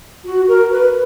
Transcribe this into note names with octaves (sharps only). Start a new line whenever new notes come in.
F#4
A#4
B4